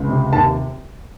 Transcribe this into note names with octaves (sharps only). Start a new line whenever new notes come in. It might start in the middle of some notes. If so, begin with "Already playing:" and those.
Already playing: C#2
C3
D#2 A5